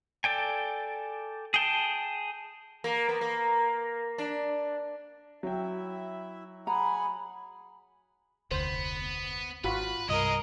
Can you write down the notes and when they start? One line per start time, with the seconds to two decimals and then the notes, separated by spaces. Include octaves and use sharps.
0.24 A4 D5 G5 G#5
1.54 G#4 G5 A5
2.84 A#3
3.09 B3
3.21 A#3
4.18 D4
5.43 F#3 E4 E5 G5
6.67 G#4 F#5 G#5 A#5 B5
8.51 F1 D2 B3 C5
9.64 G#1 F4 F#4 B4 B5
10.09 C2 G2 G#3 A#4 D#5